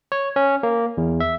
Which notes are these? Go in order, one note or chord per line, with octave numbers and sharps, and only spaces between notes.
C#5
C#4
A#3
E2
E5